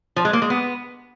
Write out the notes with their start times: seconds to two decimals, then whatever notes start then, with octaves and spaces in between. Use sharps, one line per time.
0.16 F3
0.25 G#3
0.33 A#3
0.42 G#3
0.50 B3